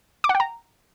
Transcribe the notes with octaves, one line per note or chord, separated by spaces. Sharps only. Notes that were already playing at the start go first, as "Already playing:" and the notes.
D6
F#5
G5
A#5